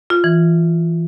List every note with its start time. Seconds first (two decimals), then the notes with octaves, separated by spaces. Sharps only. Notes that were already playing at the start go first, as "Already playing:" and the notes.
0.10 F4
0.24 E3